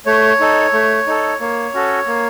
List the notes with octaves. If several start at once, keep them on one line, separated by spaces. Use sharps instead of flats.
A3 C#5
D#4 A4
A3
D#4 A4
A#3 C#5
C#4 F#4 A4
A#3